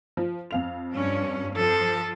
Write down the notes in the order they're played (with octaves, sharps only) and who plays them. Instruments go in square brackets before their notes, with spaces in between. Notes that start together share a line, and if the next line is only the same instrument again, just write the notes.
[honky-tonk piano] F3
F2 F5 F7
[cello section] G2 C#4
[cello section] F3 [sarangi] A4